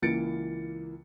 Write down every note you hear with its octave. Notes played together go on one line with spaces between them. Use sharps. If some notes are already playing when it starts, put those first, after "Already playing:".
C#2 E3 A#3 A6 C#7 D7